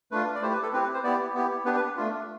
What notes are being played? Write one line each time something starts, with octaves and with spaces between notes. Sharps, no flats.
A3 D4 F4 B4
D5
A3 E4 G4 C5
B4
A4
C4 E4 G4 B4
B4
C5
B3 E4 G4 D5
B3 E4 G4
B3 D4 G4 B4
B4
A3 D4 F4